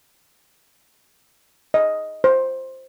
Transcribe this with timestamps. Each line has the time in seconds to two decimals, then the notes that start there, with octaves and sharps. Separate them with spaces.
1.74 D#5
2.24 C5